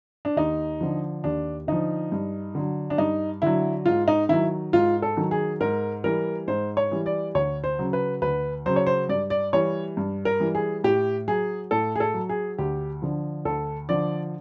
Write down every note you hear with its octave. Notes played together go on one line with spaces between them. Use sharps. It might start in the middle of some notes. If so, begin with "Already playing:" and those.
D4
D#2 D#4
D3 F3
D#2 D4
D3 F3 D#4
G2
D3 F#3
D4
G2 D#4
D3 F#3 E4
G#2 F4
D#4
D#3 F#3 E4
G#2 F4
A4
D#3 F#3
G#4
G#2 A#4
E3 G3 A#4
G#2 C5
C#5
E3 G3
D5
D2 C#5
C5
C#3 F#3
B4
D2 B4
C#3 F#3 C5
C#5
C5
G2 D5
D5
E3 G3 C#5
G2
A#4
E3 G3
G#4
A2 G4
F#3 G#4
A2 A4
G#4
A4
F#3
G#4
D2 G4
D3 F3
D2 A4
D3 F3 D5